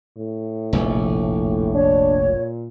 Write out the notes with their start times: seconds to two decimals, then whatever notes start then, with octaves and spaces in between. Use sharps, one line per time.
0.17 A2
0.73 F1 A#1
1.74 D4 C#5
2.28 A#2